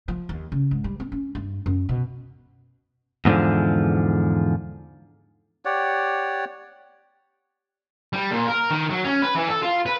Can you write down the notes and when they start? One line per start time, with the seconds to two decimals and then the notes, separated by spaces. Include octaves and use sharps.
0.08 F3
0.29 D#2
0.52 C#3
0.71 G#2
0.84 G3
1.00 C4
1.12 C#4
1.35 G2
1.66 F#2
1.89 B2
3.25 E2 G#2 B2 D3 F3
5.65 G4 C#5 D5 F#5
8.13 G3
8.31 A#2
8.48 A#4
8.71 D#3
8.90 F#3
9.04 C#4
9.22 B4
9.35 E3
9.48 A4
9.62 F4
9.86 B4